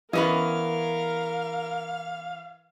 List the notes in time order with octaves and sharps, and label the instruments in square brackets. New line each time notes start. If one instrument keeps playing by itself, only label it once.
[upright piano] E3 [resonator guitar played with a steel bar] B3 C#4 D#5 [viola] A#4 [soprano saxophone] F5